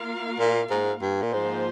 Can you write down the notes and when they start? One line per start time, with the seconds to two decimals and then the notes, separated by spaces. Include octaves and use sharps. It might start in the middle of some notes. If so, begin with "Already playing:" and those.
Already playing: A#3 F4 A#4 F5
0.39 A#2
0.70 G#2
1.02 G2
1.22 A#2
1.33 G#2 F3 A#3 F4 C5